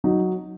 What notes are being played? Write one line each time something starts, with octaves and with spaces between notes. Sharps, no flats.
F#3 D#4